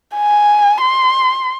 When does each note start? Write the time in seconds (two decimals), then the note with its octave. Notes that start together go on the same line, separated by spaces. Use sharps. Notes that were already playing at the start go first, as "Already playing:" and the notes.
0.17 G#5
0.81 C6